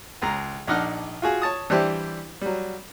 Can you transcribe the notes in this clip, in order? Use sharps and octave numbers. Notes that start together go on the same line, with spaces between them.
C#2 G#3 A#5
A#1 D4 D#4 F#5 F6
F4 F#4 G#4
C#5 A5 D#6
E3 G3 D4 E4 G4 C5
F#3 G3